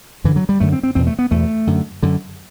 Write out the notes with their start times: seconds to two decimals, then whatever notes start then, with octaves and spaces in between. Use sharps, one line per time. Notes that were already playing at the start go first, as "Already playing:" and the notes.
0.24 F#2 D3 E3
0.36 F#3
0.49 G3
0.60 F#2 D3 A3
0.73 C4
0.83 C4
0.95 E2 B2 C4
1.07 A3
1.19 B3
1.31 E2 B2 A3
1.67 F#2 D3
2.03 F#2 D3